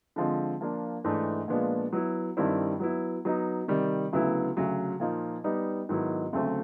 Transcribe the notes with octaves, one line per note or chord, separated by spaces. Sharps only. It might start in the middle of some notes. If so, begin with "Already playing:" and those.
D3 F3 G#3 C4
F3 A#3 D4 F4
G#2 E3 A3 D4
A#2 F3 G#3 B3 D4
F#3 B3 E4
G2 D#3 G3 C4 E4
F#3 B3 E4
F#3 B3 D#4
C3 D#3 G3
D2 C#3 F#3 B3 E4
D2 C#3 F#3
A#2 F3 A#3 D#4
G3 B3 D#4
G#2 D#3 F#3 B3 E4
D2 C#3 F#3 A3 C4